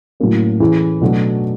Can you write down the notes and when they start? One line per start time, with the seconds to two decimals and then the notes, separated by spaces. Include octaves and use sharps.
0.20 A2 F#3 A#3 C#4
0.60 E3 A3 C#4 E4 G#4
1.01 B2 F#3 A3 D4